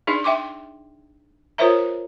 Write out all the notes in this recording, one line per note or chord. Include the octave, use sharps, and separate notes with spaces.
D4 D#4 G#4 D5
E5 G5 C6 D6
F4 A#4 C5 C#5 E5 A#5